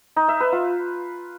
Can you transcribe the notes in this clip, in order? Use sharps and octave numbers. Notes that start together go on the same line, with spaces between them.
D#4
E5
B4
F4